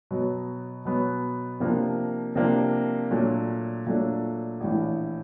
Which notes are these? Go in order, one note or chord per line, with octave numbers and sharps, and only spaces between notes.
B2 F#3 B3
B2 F#3 B3
C3 F3 A#3 D4
C3 F3 A#3 D4
A#2 F#3 A3 D4
A#2 F#3 A3 D4
A#1 A2 E3